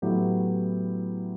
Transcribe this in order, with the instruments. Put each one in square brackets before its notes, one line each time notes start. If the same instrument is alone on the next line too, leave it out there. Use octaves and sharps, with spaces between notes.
[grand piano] A2 F#3 B3 E4 G4